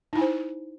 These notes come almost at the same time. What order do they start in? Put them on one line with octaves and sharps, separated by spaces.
D#4 E4 G#5 C5